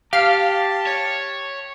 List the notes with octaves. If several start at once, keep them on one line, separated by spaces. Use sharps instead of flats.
G4 F5 A5 F6
C#5